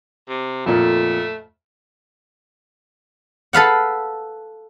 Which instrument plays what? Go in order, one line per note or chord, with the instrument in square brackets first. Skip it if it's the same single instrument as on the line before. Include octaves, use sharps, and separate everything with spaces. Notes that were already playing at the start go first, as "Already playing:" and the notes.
[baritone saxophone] C3
[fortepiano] F2 A#2 [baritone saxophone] A3
[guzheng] A4 B4 F5 F#5